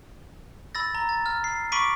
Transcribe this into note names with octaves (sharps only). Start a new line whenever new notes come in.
B5 E6 A6 A#6
A#5
A6
F6
C7
B5 C#6 D6 B6 D7 D#7